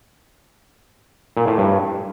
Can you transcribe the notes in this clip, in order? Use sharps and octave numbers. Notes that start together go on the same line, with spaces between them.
A#2
A2
G2